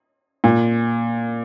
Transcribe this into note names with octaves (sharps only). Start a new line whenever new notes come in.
A#2